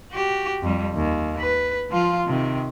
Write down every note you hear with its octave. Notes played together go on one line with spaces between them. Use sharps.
F#4 G4
F2 G3
D#2
B4
F3 F4
C3 D#3